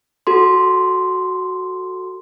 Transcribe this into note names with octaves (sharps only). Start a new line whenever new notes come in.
F#4 A4 C6